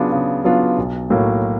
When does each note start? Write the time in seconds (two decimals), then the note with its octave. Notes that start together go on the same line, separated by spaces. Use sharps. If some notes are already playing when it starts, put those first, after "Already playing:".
Already playing: C#3 F#3 B3 D4 F4
0.12 C#3
0.45 F#3 B3 D4 F4
0.78 B1
1.10 A2 F#3 A#3